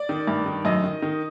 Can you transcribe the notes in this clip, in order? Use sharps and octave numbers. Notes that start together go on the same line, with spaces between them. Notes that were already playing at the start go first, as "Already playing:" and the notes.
Already playing: D5
D#3
G2
D#3
F#2 D#5
D#3
D#3